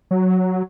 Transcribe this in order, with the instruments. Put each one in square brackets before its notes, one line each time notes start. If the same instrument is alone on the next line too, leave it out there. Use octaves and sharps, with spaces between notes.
[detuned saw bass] F#3